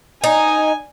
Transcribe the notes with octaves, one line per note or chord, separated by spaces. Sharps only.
D#4 G#5